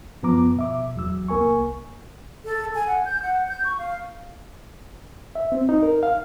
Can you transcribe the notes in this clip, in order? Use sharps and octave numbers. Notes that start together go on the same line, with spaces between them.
F#2 F3 B3 A#5 D6
B2 E5 D6
E2 F#3 E6
C2 A#3 A#4 G#5 C#6
A4
G#5
F#5
G6
F#5
G6
C#6
F5
E5
C4
D#4
A#4
F5